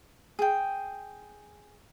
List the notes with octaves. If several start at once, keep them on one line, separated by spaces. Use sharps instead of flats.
G#4 G5